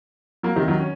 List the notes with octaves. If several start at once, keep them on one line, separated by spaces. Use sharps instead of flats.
F#3 A#3
C3 D#3
D#3 F#3
C#4